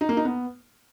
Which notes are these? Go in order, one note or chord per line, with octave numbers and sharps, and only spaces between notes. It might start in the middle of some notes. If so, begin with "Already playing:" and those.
D#4
A#3
D#4
B3